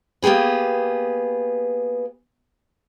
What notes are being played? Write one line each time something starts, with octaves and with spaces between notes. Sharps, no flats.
A#3 B3 G4 G#4 B4